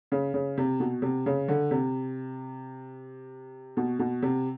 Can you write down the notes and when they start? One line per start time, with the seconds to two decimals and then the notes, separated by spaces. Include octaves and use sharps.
0.12 C#3
0.34 C#3
0.58 C3
0.80 B2
1.02 C3
1.26 C#3
1.48 D3
1.71 C3
3.77 B2
3.99 B2
4.22 C3